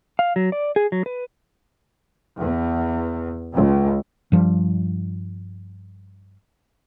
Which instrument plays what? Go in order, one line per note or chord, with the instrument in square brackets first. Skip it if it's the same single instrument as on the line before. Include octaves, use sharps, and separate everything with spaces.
[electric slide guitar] F5
F#3
D5
G#4
F#3
B4
[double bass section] E2
C#2
[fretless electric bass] G2 F3 G3